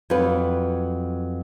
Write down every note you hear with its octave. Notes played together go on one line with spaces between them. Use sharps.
F2 F#3 B4